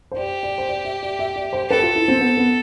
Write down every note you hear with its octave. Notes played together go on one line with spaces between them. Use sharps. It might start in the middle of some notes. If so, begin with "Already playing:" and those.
C5
G4 D5
D5
C5
D5
E5
D5
E5
D5
C5
A4 B4
F4
E4
C4
B3
B3